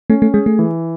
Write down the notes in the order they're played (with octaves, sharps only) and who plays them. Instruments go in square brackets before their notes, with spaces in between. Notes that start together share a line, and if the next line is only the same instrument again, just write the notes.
[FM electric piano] A3 [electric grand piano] C#4
[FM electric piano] A3
[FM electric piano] G#3 [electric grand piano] G#4
[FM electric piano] A3
[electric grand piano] E3